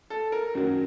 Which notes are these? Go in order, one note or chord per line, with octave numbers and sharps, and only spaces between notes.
A4
A#4
F#2 D#3 F#3